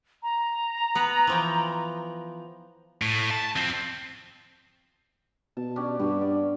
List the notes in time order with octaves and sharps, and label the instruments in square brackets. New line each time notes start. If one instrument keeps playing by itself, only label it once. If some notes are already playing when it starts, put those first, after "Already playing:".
[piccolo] A#5
[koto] B3 B4
E3 F3 G5
[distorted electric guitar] A2
A5
F2 C4
[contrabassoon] B2 [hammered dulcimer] A5
[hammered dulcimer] C#4 D4 G4
[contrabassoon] G2 [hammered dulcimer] B3 C#4 G4
[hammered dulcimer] D5